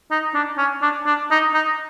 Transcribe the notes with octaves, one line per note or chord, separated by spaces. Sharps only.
D#4
D4
C#4
D4
D4
D#4
D#4